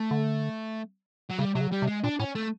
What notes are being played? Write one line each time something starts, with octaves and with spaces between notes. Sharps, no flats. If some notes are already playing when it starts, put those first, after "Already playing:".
Already playing: A3
D3
F#3
C#3 G3
C3 F#3
C#3
G3
C3
G#3
A#2 D4
A2 C#4
A3